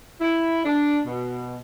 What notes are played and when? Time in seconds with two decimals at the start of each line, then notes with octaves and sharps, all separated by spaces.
0.21 E4
0.65 D4
1.05 B2